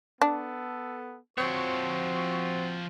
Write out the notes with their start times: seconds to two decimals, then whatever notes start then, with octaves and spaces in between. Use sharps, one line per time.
0.22 B3 D4 A4
1.38 F3 C4 F#4 C#5 C#6